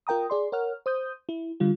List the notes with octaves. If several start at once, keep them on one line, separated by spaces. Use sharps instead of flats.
F4 A#4 G5 A#5 D#6
G#4 D5 C6
A#4 C#5 F#5 F6
C5 D#6 G6
E4
D3 G3 F4